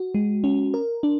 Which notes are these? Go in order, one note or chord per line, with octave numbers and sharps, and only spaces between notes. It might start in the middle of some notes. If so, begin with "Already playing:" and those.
Already playing: F#4
G#3
C#4
A#4
D4